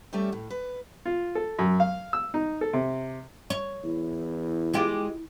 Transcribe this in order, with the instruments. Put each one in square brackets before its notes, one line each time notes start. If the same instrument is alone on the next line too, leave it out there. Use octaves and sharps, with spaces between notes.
[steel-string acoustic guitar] G3 A3 C#4 G4 D5 E5
A2
B4
[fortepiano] F4
A4
F#2
F5
E6
D#4
A4
C3
[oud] C#5
[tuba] E2 [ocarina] E4
[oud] G#3 F4 G4